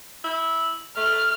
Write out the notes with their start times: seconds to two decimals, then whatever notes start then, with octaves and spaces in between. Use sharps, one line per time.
0.24 E4
0.97 A3 F6